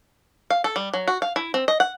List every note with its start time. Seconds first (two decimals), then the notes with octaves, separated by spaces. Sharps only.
0.50 F5
0.64 A4
0.76 G3
0.94 F#3
1.08 F#4
1.22 F5
1.36 E4
1.54 C4
1.68 D#5
1.80 F#5